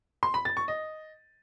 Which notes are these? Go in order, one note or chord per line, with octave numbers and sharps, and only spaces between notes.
C6
B5
A6
C#6
D#5